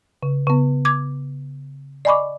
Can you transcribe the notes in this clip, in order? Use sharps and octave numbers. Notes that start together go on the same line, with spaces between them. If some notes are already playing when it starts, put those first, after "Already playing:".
C#3
C#3 B3
D6 G#6
D5 D#5 G#5 B5 C#6 D6